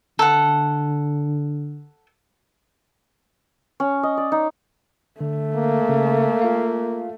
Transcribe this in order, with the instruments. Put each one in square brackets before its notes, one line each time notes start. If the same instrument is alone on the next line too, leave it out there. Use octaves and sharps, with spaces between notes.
[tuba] D3 [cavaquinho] A4 F#5
[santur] C#4
D#5
D5
D#4
[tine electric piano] D3 [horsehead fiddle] A3
[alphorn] A#3
[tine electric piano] C#3
F4 F5